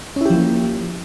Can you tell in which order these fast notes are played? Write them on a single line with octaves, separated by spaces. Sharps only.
C#4 E4 G4 F3 A#3